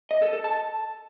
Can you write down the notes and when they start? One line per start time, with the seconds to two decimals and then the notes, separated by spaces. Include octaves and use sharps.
0.11 D#5
0.22 A4
0.33 A4
0.44 A5